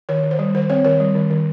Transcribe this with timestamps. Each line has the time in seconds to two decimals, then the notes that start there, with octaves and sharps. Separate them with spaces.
0.09 D#3 C#5
0.23 D#3
0.31 C5
0.39 G3
0.54 D#3 C5
0.70 C4 C#5
0.85 D#3 C#5
1.00 G3
1.15 D#3
1.31 D#3